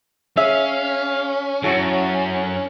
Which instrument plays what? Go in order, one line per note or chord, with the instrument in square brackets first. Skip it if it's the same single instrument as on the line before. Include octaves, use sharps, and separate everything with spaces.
[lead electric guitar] C#4 [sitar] G#4 [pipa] E5 [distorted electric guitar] F5
[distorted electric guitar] F#2 [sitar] E4 F#4 A4